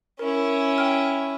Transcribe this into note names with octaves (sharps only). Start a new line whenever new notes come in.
C#4 E4 A#4
G5 F6